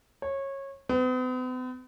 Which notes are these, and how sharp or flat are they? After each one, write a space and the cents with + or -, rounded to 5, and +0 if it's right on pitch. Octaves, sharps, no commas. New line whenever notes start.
C#5 -20
B3 +45